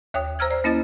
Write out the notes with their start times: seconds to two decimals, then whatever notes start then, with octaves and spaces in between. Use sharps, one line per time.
0.14 D#2 C#5 G5 D#6
0.39 C5 A#5 E6 F6 G#6
0.51 D5
0.64 A#3 C#4 E4 D#5 A6